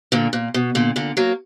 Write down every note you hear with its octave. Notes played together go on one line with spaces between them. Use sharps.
A#2 D3
A#2
B2
A#2 D3
A#2 D3
F#3 A#3